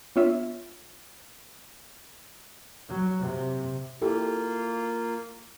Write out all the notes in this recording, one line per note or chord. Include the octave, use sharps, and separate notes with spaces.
B3 D4 F4 C#5 E5
F#3
C3
A#3 E4 F4 G4 A4